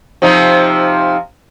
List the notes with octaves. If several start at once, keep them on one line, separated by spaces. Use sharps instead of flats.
C3 F3 D#4